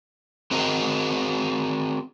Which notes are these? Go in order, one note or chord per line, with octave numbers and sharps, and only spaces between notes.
C4 F#4 G#4 A#4 C5 D#5